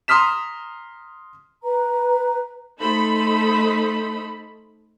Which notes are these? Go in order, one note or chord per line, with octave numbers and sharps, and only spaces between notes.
A#5 C6 D#6 F6 B6 E7
B4 A#5
A3 D#4 A4 C5 B5